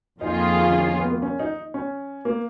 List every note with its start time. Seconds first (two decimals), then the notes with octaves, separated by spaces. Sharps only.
0.20 F2 D#3 A#3 D#4 F4 G#4
0.72 C#4
0.85 C#4
0.98 B3
1.10 A#3
1.22 C#4
1.40 D#4
1.74 C#4
2.25 A#3